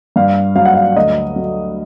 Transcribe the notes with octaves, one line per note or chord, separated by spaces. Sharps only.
G2 F5
F#3 F5
F#5
F5
D2 D#5
F#3